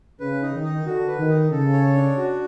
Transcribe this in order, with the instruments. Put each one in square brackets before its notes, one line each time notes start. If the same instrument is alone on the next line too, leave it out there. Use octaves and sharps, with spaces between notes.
[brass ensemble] C#3 [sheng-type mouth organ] B4
[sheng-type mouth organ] D#4
[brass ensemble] D#3
[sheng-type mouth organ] D#4
[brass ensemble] D3 [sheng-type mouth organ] F#4
[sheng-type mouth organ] B4
[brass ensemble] D#3
[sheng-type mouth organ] D#4
[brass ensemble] C#3 [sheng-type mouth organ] A4
[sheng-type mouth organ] C#5
D4
F#4